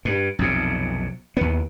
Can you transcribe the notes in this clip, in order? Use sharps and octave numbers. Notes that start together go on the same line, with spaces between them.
G2
B1 F2 C3
D#2 B3